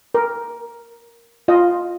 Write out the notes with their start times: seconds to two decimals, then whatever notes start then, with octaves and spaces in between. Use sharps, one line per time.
0.14 A#4
1.48 F4 D#5